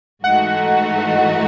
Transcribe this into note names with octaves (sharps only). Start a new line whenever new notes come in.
G#2 E3 A3 D#4 F#4 F#5